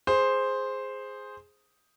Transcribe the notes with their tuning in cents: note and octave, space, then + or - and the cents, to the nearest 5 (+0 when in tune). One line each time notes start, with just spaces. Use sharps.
G#4 +0 C5 +0